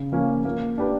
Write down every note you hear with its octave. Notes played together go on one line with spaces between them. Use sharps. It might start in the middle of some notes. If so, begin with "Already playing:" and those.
Already playing: C#3
F3 A#3 C#4
A#3
D4 G4 B4